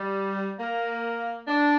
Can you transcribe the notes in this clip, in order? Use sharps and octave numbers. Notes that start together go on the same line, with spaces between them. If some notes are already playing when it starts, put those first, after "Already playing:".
Already playing: G3
A#3
D4